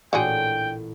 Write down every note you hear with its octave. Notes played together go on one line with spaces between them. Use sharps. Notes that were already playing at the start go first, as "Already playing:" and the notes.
A1 A#2 D3 F#4 G#4 G5